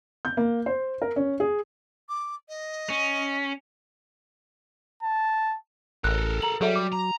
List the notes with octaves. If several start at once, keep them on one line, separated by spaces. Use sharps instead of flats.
G6
A#3
C5
A#4
C#4
G#4
D6
D#5
C#4
A5
A1 A4 A#4 F#6
A#5 F#7
F#3 G3 G#4 A4 E5
D6
A#5